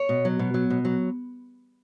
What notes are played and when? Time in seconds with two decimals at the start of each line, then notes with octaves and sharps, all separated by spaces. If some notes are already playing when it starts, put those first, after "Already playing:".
Already playing: C#5
0.09 B2
0.25 F#3
0.39 B2
0.54 F#3
0.70 B2
0.85 F#3